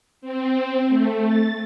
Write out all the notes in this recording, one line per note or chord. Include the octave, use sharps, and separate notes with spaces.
C4
A3
A6